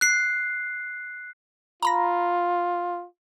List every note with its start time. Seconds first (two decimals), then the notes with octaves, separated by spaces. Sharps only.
0.01 F#6 C7
1.83 F4 A#5 B5 A#6